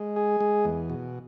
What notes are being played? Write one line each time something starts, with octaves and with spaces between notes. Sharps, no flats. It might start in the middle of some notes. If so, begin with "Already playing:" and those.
Already playing: G#3
G#4
G#3
E2
B2